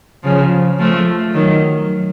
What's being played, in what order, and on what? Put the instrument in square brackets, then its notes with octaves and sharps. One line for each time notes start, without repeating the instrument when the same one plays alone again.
[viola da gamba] C#3 F3
F3 A3
D#3 F#3